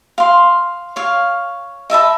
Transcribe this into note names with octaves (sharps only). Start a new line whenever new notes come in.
F5 C6
C#5 F5
D#5 E5 A5 B5